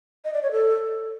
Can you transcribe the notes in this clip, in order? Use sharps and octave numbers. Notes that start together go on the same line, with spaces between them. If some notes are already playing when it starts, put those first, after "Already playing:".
D#5
D5
C#5
A4